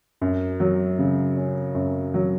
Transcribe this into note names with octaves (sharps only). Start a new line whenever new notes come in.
F#2
F#3
C#3
C#4
F#2
F#3